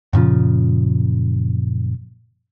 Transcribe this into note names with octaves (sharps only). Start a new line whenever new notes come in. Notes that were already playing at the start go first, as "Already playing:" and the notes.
F#2 A#2 C#3 F3